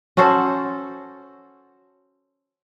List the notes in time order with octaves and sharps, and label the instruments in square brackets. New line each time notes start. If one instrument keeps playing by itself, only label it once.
[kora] C#4 F#4 A4 C5